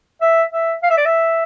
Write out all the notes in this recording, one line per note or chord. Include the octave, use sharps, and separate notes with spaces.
E5
E5
F5
E5
D5
E5